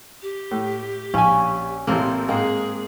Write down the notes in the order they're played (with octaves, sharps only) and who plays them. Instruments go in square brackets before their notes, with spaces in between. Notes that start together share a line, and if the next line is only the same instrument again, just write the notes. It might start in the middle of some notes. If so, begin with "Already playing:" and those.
[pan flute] G4
[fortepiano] A2
[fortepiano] A#1 [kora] C#4 [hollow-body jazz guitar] F5 G#5
[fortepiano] A1 C3 [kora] A#3 C4 A4
[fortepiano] G#2 G#3 [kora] A#3 [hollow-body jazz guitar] C4 F5 [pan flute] G#4